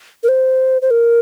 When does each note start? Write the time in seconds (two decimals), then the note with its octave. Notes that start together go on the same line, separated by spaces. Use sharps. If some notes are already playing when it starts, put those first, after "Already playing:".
0.24 A#4
0.29 C5
0.82 C5
0.91 A#4